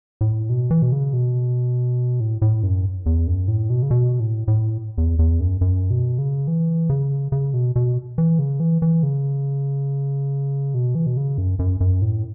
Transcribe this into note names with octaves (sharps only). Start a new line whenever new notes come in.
A2
B2
E3
B2
C#3
B2
A2
A2
F#2
E2
F#2
A2
B2
C#3
B2
A2
A2
E2
E2
F#2
F#2
B2
C#3
E3
C#3
C#3
B2
B2
E3
C#3
E3
E3
C#3
B2
E3
B2
C#3
F#2
F#2
F#2
A2